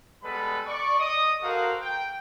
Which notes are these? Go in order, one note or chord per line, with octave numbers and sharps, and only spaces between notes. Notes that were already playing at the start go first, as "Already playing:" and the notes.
G3 G#3 B3 A4 B4 B5
D5 C#6
D#5 D#6
F#4 A4 A#4 C5 F5
G5